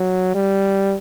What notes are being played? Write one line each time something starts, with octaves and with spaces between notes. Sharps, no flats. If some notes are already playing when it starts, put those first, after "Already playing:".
Already playing: F#3
G3